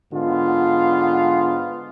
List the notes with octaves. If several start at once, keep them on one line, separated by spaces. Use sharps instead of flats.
G#2 D3 B3 F4